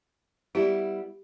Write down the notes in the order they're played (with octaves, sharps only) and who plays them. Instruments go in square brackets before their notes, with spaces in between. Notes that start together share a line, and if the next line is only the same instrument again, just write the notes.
[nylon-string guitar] G3 B3 E4 [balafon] G4